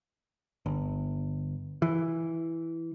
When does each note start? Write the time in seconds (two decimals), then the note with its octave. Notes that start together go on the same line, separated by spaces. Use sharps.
0.66 G1
1.82 E3